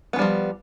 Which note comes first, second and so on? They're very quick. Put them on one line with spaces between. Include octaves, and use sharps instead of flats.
B3 E3 G3 F3